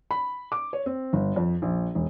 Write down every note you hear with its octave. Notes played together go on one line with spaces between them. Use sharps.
B5
D6
C#5
C4
G1
F2
A#1
E1